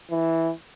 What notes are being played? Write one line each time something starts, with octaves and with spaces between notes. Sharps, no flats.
E3